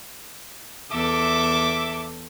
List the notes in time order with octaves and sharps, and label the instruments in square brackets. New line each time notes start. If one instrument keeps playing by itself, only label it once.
[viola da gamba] E2 A4 [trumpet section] E5 D6